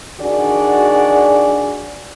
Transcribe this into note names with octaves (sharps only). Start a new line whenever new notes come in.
D#3 D4 F#4 G#4 D5